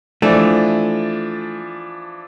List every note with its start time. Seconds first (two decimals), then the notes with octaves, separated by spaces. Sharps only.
0.22 E3 F3 A3 D4